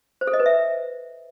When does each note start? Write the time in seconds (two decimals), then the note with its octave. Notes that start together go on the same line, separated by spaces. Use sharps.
0.21 C5
0.27 A4
0.33 D#5
0.40 B4
0.46 E5